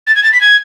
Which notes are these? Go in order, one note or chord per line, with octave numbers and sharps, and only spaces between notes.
A6
G#6
A6
B6
G#6